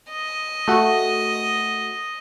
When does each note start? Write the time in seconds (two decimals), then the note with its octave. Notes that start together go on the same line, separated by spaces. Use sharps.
0.11 D#5
0.68 A3 F#4